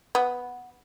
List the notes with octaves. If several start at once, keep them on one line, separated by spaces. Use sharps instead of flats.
B3